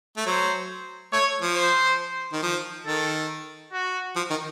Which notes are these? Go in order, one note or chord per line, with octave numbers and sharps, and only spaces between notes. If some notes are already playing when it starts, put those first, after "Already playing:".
A3
F#3 C5
A3 C#5
F3
C5
D#3
F3
D#3 A4
F#4
F3
D#3